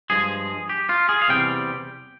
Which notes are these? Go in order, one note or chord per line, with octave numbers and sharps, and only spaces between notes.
G2 F3 G#3 G#4
G4
F4
G#4
F5
E2 C3 G3 C4 G5